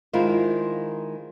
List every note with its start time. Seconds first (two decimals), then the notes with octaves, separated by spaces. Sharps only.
0.13 D#3 G#3 E4 F4 C5